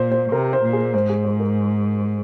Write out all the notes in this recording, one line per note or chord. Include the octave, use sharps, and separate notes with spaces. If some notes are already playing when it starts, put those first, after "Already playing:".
Already playing: A#2 C5
C5
C3 A#4
C5
A#2
G#4
G#2 C5
G#4
C5
A#4